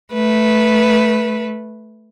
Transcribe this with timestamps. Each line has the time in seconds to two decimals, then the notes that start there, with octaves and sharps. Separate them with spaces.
0.13 A3 B4